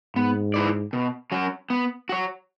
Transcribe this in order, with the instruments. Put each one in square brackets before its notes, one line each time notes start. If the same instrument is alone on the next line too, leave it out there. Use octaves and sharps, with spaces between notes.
[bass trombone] G#2 [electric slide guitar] B3
[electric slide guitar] E4 B4 D5
B2
F#3 C#4 F#4
B3
F#4 C#5